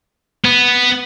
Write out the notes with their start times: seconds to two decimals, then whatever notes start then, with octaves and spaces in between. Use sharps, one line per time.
0.44 B3